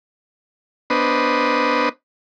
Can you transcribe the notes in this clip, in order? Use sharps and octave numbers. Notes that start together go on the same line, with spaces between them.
B3 D4 B4 C5 D#5